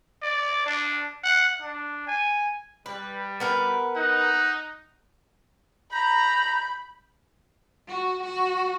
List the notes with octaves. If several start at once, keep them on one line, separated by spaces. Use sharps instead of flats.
D5
D4
F#5
D4
G#5
G3 B4
B3 A#4 B4
D#4 F#5
A#5 B5 G6
F#4
F#4